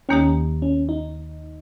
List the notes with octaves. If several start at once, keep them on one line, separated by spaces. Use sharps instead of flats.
D#2 D#3 A#3 C#4 D#4 G4
C#4
D#4